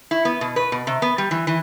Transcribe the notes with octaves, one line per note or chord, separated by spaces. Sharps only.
E4
B3
B2
B4
B2
C3
B3
G3
E3
E3